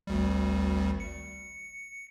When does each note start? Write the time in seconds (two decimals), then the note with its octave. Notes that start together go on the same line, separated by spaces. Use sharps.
0.07 G#1 D2 G3
1.00 C#7